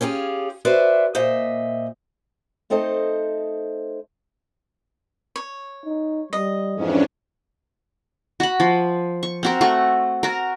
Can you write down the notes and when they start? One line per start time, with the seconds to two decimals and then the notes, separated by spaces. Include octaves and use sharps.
0.01 C#4 F4 G4 G#4
0.65 F#4 B4 C5 D5 E5
1.15 A#2 C5 D#5 E5
2.70 A3 C4 D#4 A4 C5 D#5
5.36 C#5
5.85 D#4
6.33 G3 D#5
6.76 F2 G#2 E3 C#4 D4
8.40 F#4 B5
8.60 F3
9.23 C#6
9.43 C4 F#4 A#4
9.61 A3 F#4
10.23 F#4 A#4